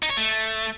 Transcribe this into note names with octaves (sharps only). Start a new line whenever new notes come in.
D#4
C#5
A3